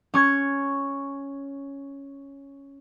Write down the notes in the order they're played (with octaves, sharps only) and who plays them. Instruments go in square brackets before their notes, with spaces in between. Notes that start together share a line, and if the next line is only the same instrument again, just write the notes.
[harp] C#4 C#6 G#6